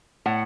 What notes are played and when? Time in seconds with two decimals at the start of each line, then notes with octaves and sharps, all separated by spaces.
0.26 A2 F#5